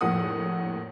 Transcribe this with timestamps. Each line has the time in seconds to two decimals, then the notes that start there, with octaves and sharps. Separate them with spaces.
0.01 F1 A#1 A2 A#3 F#5 D#6